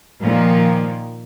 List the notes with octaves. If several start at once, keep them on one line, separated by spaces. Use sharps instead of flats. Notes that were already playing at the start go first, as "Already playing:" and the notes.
A#2 D#3 F3 A#3